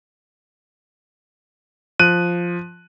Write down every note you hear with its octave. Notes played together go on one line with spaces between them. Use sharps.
F3 F#6 D#7